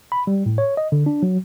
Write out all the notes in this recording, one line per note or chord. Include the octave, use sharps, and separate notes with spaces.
B5
G3
A2
C#5
D#5
D3
D4
F#3